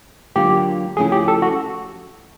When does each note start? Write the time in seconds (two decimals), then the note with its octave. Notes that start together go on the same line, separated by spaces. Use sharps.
0.35 D3 F#3 A#3 D4 F4 G4
0.97 C#3 F3 A3 C#4 E4 G#4
1.12 G4
1.28 A4
1.42 F#4